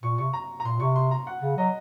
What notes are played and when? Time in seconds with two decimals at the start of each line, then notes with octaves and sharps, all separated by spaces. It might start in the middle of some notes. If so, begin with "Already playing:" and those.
0.03 A#2 C#6
0.18 C3 C#6
0.33 A#5
0.60 A#5
0.64 A#2 C6
0.80 C3 C#6
0.96 C6
1.11 A#5
1.27 F#5
1.42 C#3
1.57 F#3 D#5